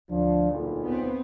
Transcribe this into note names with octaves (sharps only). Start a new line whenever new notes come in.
D2 F3 D4
B1 A#2
B3 C4